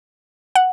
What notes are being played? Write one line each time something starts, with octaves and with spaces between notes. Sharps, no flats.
F#5